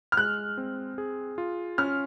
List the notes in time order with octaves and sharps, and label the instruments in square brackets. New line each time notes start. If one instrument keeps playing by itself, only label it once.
[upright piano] F6
[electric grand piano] G#3 [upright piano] F#6
[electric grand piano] C4
G#4
F4
[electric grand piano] C#4 [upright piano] F6